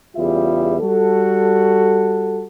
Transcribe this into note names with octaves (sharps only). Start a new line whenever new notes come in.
E2 C#3 G3 F4 E5
G3 F#4 A4